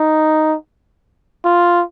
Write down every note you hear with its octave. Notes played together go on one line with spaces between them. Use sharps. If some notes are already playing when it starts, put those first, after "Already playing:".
Already playing: D#4
F4